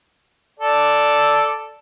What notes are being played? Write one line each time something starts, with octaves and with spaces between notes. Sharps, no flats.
A4 D5